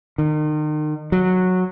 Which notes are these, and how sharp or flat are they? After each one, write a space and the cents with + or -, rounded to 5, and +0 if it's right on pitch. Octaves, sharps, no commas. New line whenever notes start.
D#3 -35
F#3 -10